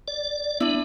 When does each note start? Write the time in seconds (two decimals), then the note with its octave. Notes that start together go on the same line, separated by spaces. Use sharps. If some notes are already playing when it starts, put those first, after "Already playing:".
0.08 D5
0.60 B3 D4 E4